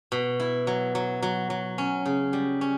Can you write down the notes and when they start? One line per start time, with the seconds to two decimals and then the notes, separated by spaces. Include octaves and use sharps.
0.12 B2
0.40 E4
0.67 F#3
0.95 F#3
1.23 F#3
1.50 F#3
1.78 C#4
2.06 C#3
2.33 G3
2.61 C#4